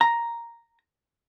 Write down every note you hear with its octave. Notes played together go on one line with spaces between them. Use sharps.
A#5